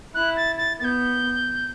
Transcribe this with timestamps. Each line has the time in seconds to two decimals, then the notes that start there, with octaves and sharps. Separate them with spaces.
0.14 E4 F#6
0.36 A6
0.57 A6
0.79 B3 A6
0.84 G6